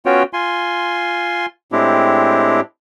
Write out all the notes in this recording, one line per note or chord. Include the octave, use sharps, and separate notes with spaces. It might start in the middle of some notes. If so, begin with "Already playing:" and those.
B3 C#4 F4 F#4 C#5 G5
F4 G#5 C6
A2 G#3 C4 D4 E4 G4